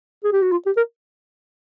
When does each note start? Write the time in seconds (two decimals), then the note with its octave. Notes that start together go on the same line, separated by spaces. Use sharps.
0.24 G#4
0.33 G4
0.43 F#4
0.52 F4
0.66 G4
0.77 A#4